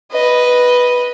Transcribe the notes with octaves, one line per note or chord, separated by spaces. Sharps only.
B4 D#5